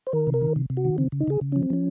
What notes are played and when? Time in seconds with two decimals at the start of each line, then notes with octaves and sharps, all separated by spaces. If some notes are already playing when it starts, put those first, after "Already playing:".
0.07 C5
0.13 D#3 A#4
0.27 C3
0.34 A#4
0.42 D#3
0.56 C3
0.70 C3
0.77 F#4
0.85 D#3
0.98 C#3 C4
1.12 C#3
1.20 D#4
1.28 C#3 G#4
1.41 C#3
1.52 F3 C#4
1.63 C4
1.70 F3 C#4